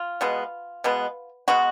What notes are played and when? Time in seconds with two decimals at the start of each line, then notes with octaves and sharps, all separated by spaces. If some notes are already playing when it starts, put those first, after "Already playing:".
Already playing: F4
0.21 B2 G#3 B3
0.84 B2 G#3 B3
1.48 B2 G#3 B3 F#4